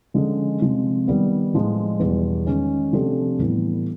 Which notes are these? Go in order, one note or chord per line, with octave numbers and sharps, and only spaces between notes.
D3 F3 G#3 C#4
C3 F3 G#3
D#3 G3 B3
A2 F3 G#3
E2 B2 G3
D#3 G#3 C#4
C3 F3 A3 D4 G4
A2 E3 G3 B3